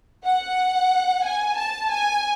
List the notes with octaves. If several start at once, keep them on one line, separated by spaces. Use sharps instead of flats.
F#5
G#5
A5
G#5